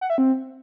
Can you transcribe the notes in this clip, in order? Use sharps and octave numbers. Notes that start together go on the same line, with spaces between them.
F#5
E5
C4